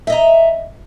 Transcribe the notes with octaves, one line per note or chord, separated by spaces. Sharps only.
D#5 E5 A#5